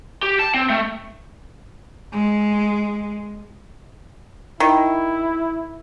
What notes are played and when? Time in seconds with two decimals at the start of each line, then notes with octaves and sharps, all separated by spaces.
0.23 G4
0.39 A5
0.54 C4
0.70 A3
2.13 G#3
4.60 D#3 E4